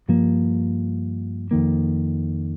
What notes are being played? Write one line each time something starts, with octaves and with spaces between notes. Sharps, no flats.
G2 F3 A#3
F2 D#3 A#3